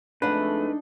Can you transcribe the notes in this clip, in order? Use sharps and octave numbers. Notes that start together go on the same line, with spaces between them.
F2 G#3 A3 D4 D#4 B4 F#5